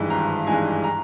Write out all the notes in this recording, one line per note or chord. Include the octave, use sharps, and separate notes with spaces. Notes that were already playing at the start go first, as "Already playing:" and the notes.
Already playing: G#1 G2 E3 G#3 D#4
G#1 A#5
G2 E3 G#3 D#4 G#5
A#5